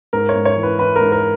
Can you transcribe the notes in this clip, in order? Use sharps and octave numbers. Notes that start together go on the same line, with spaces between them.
G#2 A#4
C#5
G#2
C#5
E3
B4
E3 B4
A#4
G#2
A#4